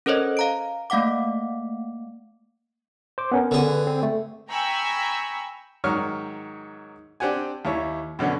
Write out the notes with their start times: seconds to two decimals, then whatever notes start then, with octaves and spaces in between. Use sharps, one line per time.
0.06 C#4 A4 A#4 C5 C#5 D#5
0.37 F5 A#5 D7
0.90 A3 A#3 F5 F#5 D6
3.18 C5 D6
3.32 B3 C#4 A#4
3.51 D3 G#4
3.65 B4
3.87 C4
4.03 A3
4.50 G5 G#5 A#5 B5 C#6 E6
5.84 G#2 D#3 F#3 C#5 F6
7.20 C4 D4 G4 F#5 G#5
7.65 D#2 E4 C#5
8.19 F#2 B2 D3 C#4